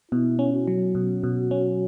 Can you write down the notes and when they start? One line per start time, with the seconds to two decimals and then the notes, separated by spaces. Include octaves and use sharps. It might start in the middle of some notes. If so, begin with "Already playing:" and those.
0.11 B2 E4
0.39 C#4
0.54 F#4
0.67 F#3
0.95 B2
1.23 B2
1.51 C#4